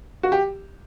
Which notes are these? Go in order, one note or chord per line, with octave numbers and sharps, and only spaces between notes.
F#4
G4